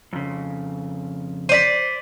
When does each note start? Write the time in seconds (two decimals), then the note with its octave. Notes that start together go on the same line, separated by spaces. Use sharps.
0.13 F2 C#3
1.49 C5 D5 B6 D#7